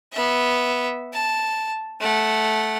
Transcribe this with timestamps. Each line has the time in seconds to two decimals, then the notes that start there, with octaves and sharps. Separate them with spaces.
0.13 B3 E5
1.13 A5
2.00 A3 F#5